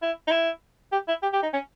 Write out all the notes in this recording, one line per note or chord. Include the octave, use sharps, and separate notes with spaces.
E4
D#4
E4
G4
E4
G4
G4
D#4
C#4